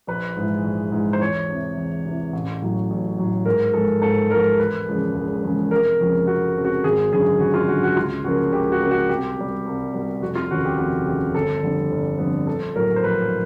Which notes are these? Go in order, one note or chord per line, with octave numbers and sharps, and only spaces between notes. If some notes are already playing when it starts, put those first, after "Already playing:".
A#1 B4
G#2 E3 G#3
A#1
G#2 E3 G#3
C5
E2 C#5
C3 E3
E2
C3 E3
A1
A2 F#3
A1
A2 F#3
G#2 A#4
F3 G#3 A4
G#2 A4
F3 G#3 A#4
E1 B4
E2 C#3 F3 G#3
E1
E2 C#3 F3 G#3
F1 A#4
F2 C#3 F3
F1 F#4
F2 C#3 F3
F#4
G#1 G#4
F#2 D3 G#4
G#1 F#4
F4
F#2 D3 F#4
F#4
C#2 F4
C#3 F3 A#3 F#4
C#2 G4
F#4
C#3 F3 A#3
F#4
C2 G4
B2 G3
C2
B2 G3
F1 F#4
F4
D#2 C#3 F#4
G4
F1 F#4
D#2 C#3 G4
G1 A4
F2 D3 G3 B3
G1
F2 D3 G3 B3
A#1 A4
A2 F#3 A#3 A#4
C5
A#1 B4